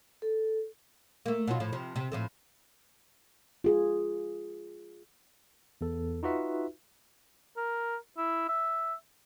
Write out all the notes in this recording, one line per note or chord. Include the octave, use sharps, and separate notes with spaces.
A4
A3 A#3
B2 F#3 F4
A2 F3
C3 F3
C3
A2 F3 A3
F4 G#4
E2 A4
D#4 F4 F#4 B4 E5
A#4
E4
E5